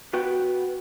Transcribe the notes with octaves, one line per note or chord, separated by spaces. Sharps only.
B3 F#4 B4 G5